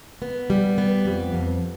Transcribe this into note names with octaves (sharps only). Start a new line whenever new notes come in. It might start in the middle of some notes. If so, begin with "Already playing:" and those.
B3
G3
B3
F2
F2